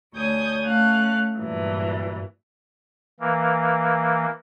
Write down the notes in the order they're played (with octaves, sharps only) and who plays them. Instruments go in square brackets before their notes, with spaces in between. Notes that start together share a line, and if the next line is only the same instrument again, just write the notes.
[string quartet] D2 C#5 G#5 D#6 G6
A3 C#4 F5 F#6
G2 A#2 E3 F#3
[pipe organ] E3 A#3